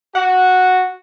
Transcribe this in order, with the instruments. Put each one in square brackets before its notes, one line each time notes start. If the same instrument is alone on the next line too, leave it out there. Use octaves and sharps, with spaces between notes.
[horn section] F#4 [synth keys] F#5